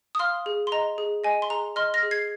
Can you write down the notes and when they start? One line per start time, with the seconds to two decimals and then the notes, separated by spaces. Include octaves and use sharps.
0.15 D#6
0.19 F5 C6 F6
0.46 G#4
0.67 C6
0.72 D#5 A#5
0.98 G#4
1.24 D#5 G#5
1.42 C6
1.50 G#4 A#5
1.76 D#5 C6 F6
1.94 F6 A#6
2.03 G#4
2.11 G#6 C7